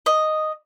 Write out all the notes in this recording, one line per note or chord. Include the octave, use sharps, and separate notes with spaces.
D#5